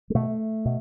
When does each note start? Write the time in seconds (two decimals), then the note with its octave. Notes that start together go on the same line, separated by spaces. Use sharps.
0.10 G#3
0.15 B2 A3
0.65 B2